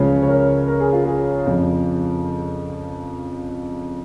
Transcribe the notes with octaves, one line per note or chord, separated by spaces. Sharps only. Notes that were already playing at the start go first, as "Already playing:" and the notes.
Already playing: C#2 C#3 F3 C#5
C#5
A#4
A#4
G#4
F4
G#4
F2 C#3 F3